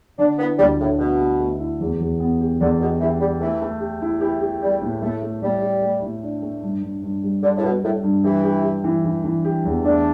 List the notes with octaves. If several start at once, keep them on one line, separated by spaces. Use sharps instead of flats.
D3 D4
B3 E4
D2 G3
A2 D3
B2 A3
A3
A3
E4
E2
E2
B3
G4
E2 D3
B2 G4
E3 G4
G3 G4
E3 A3
A3
G4
E4
E3 G4
G4
G3 G4
A2
A2 A3
A3
A2 G3
G4
A3
A2
D4
A3
G2
G2
G2
G3
D3 G3
A2
B2 G3
A2 G3
G2
E3 G4
G4
G4
E3
E3
E3
G4
E2
A3 D4